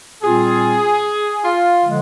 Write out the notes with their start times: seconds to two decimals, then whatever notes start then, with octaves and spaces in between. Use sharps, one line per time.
0.22 A#2 G3 C4 F4 G#4
1.43 F4
1.84 D3 F3 G#3